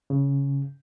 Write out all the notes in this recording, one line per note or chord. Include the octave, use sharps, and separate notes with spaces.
C#3